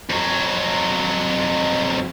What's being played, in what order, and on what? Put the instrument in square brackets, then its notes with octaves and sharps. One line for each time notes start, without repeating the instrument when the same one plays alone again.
[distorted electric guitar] F2 F#3